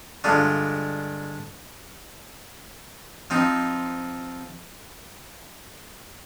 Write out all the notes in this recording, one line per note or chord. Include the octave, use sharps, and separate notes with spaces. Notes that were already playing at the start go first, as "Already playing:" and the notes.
G2 D3 G#3 D4 F4
F3 C4 D#4